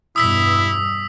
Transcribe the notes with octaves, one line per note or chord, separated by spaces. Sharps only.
E2 G2 B2 E4 D#6 E6 B6